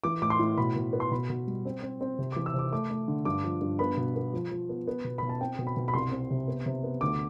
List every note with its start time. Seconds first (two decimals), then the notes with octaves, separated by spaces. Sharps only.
0.04 E3 D6
0.22 A2 D6
0.30 C6
0.39 A2
0.58 B2 B5
0.76 B2
0.93 B3
1.00 C6
1.11 B2 B5
1.30 B2
1.47 G3
1.65 C4
1.82 C4
2.01 C4
2.19 C3
2.32 D6
2.36 E3
2.46 E6
2.54 C3 D6
2.72 A3 D6
2.90 A3
3.08 D3
3.25 G2 D6
3.44 F3
3.61 G2
3.79 B3 B5
3.97 B2
4.16 B3
4.33 F3
4.51 F3
4.69 B3
4.88 B3
5.04 B2
5.18 B2 B5
5.29 A5
5.41 C4 G5
5.59 B2
5.67 B5
5.77 B2
5.88 B5
5.94 C2 C6
6.12 C4
6.31 C3
6.48 B3
6.66 C3
6.83 B3
7.01 D2 D6